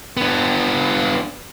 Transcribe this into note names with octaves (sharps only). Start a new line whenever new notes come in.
B3 D4